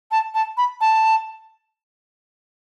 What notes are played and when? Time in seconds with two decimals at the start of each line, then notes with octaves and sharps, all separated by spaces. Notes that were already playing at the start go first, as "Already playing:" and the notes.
0.11 A5
0.34 A5
0.57 B5
0.81 A5